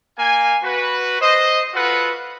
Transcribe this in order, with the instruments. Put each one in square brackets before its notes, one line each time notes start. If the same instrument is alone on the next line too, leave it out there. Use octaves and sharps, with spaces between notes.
[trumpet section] A#3 F5 G#5
F#4 B4
C5 D#5
F4 F#4 A4 B4 F#5